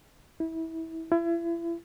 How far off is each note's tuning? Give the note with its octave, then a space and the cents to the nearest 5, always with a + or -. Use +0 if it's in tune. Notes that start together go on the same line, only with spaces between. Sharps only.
E4 -25
E4 +35